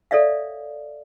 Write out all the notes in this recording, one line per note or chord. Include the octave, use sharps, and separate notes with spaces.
A4 C#5 D5 E5 F5